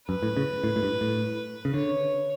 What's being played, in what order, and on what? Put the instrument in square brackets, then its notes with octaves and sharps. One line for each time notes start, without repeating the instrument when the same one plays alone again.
[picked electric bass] F#2 [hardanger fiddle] B4
[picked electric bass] A2
C#3
A2
A2
G2
A2
C#3
[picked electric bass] D3 [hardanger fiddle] C#5